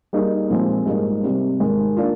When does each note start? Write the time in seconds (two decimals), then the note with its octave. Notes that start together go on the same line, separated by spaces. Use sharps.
0.13 G3 A#3 D#4 G#4
0.50 A#2 F3 G#3 C4
0.86 G#2 G3 A#3 D#4 G#4
1.23 C3 G3 C4
1.60 G#2 D#3 G#3
1.97 A#3 D4 F4